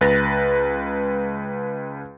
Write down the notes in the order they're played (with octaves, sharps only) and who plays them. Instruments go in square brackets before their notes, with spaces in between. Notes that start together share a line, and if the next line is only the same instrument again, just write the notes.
[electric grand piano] C#2 B4 A6 A#6